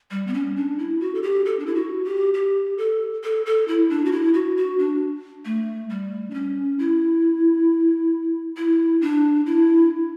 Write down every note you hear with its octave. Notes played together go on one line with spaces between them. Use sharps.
G3
B3
C#4
D4
E4
F#4
A4
G4
A4
D4
E4
F#4
G4
G4
A4
A4
A4
E4
D4
F#4
E4
F#4
F#4
D4
A3
G3
D4
C#4
E4
E4
D4
E4